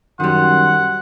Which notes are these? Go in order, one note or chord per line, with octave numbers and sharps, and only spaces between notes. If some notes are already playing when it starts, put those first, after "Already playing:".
F#2 D#3 G3 F#5 C6